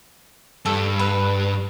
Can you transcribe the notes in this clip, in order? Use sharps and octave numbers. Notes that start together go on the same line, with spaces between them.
G2 A4
B4